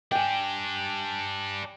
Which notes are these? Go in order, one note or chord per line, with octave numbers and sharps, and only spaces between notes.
D4 G4 G5 G#5